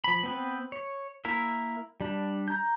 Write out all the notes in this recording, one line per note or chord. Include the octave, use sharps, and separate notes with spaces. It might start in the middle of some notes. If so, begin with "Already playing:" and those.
F3 B5
B3 C4 B4
C#5
A#3 E4 A#4 E5
G3 D4
A#5 G6